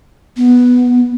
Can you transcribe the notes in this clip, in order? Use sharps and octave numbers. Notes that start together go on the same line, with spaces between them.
B3